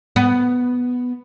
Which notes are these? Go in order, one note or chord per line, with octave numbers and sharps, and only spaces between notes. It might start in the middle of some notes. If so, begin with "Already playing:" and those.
B3